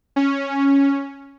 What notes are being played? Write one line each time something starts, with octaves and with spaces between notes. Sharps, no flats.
C#4